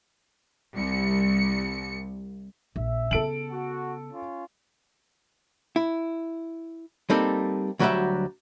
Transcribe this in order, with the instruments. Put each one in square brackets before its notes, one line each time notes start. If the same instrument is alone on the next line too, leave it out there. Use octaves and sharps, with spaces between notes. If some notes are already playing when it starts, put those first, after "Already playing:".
[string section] C2 C#7
[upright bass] A#1 [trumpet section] E5
[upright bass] C#3 B3 [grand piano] A4 D7 F#7
[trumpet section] F#4
C#4 F4
[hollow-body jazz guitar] E4
G3 A#3 C4 D#4 A4
D2 F#3 G3 F#4 G4 E5